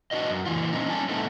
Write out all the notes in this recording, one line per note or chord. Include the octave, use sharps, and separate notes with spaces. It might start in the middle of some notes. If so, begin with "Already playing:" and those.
D4 F#4 B4 D#5
F#2
A#2 E3 F4
C4 C#4 D#4
G3 C#4 G#5 A5
A2 A3 B3 C4 D#4 A4